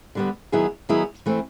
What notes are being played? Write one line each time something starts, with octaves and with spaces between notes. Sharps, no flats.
D3 G3 B3
D#3 F#3 B3 E4 G#4
D#3 F#3 B3 E4 G#4
E3 A3 C4